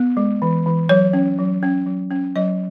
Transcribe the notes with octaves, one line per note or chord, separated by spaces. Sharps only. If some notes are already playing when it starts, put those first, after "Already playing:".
Already playing: B3
G#3
E3
E3
F#3 C#5
C#4
F#3
C#4
F#3
C#4
F#3 D#5